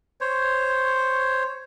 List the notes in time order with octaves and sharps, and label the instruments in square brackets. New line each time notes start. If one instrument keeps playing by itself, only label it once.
[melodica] C5 C#5